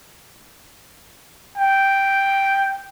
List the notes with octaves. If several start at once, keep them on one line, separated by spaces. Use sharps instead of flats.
G5